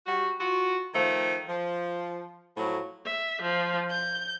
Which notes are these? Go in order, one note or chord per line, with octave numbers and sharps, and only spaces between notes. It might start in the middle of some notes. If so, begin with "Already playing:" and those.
G3 F#4
F4 F#4
D#3 F3 A3
F3
A2 F3 F#3
E5
F3
G6